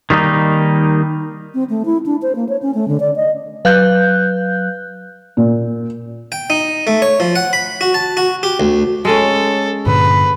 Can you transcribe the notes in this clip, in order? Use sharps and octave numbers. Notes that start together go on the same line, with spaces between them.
D#3 G3 A#3 D#4
C4
A3
E4
D4
C5
A#3
C#5
C#4
A3
D3
D5
D#5
F#3 B4 F5 F#6 G6
A#2
G5
D#4
A3
C#5
F3
F#5
B5
F#4
A5
F#4
G4
D2
G#3 C#4 A4
G2 A#2 D3 B4